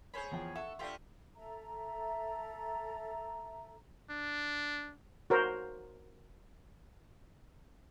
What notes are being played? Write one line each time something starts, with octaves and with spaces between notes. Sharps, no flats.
C#4 G#4 C5 C#5 B5
E2 F3 G5
A4 E5 F#5 C#6
A3 B3 D4 F4 G4
A4 E5 A#5
D4
F#4 A#4 C5